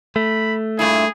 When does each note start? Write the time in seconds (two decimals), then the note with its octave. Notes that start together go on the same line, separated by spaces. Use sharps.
0.16 A3 B5
0.79 G2 A#2 E4 G#4